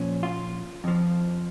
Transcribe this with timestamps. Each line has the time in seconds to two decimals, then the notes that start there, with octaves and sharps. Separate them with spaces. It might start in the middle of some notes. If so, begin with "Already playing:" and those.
Already playing: A#2 F3 C#4
0.23 F4
0.84 F2 F3